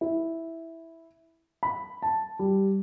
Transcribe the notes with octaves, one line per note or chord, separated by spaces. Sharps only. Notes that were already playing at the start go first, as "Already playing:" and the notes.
E4
B5
A5
G3